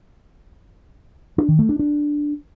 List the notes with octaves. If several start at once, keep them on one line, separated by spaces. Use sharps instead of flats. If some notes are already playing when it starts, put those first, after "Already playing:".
D4
D#3
A3
D4
D4